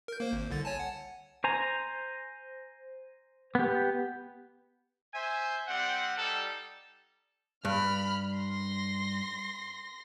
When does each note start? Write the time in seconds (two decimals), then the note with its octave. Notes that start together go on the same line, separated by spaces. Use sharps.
0.08 A#4 G6
0.20 A#3 C5
0.32 G#1
0.50 C2 D3 A6
0.65 C#5 G#5 A5
0.79 F#5
1.44 C5 G#5 A#5
3.55 B3 G4
5.13 C5 E5 G#5
5.67 G3 C4 F#5
6.18 G3 D#4 A4
7.65 G2 B5 F6
8.38 C6 A#6